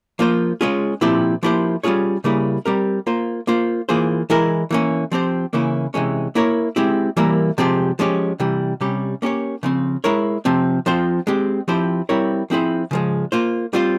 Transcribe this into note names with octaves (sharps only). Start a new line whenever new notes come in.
F3 A#3 F4 C5
G#3 C#4 F4 G#4
A#2 F3 C4 E4 G4
F3 A#3 E4 G4 C5
G3 C#4 F4 G#4 C#5
C#3 G3 A#3 E4 G#4
G3 C4 G4 A#4
A#3 F4 C5
A#3 F4 C5
E3 A#3 F4 G#4 C5
E3 G#3 E4 A#4
E3 A#3 C#4
F3 C4 G4 C5
C#3 E3 A#3 C#4 E4
C3 E3 G#3 C#4
A#3 E4 A#4 C#5
G#3 C4 E4 G4
E3 G3 A#3 E4 A#4
C3 F3 G#3 C4 G4
F3 G#3 C#4 G4
C3 E3 G3
C3 G3 C#4 G4
A#3 C#4 G4 C#5
C#3 F3 C4
G#3 E4 A#4 C#5
C3 F3 C4
F3 C4 F4 C5
G#3 C4 G4
F3 C4 E4 G4 C5
G3 C4 E4 A#4 C#5
F3 C4 E4 G#4 C5
C#3 F3 G#3
A#3 F4 C5
G3 C4 F4 C5